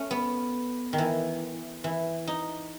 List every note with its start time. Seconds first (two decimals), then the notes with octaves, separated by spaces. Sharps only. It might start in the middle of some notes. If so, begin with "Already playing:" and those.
Already playing: A3 C#4
0.11 B3
0.93 D#3
0.98 E3
1.84 E3
2.27 D#4